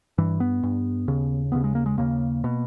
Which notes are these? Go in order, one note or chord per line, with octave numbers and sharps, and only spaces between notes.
G2 E3
B3
G2
D#2 C#3
D#2 C#3 B3
G#3
A#3
G#3
D#2 C#3 A#3
B2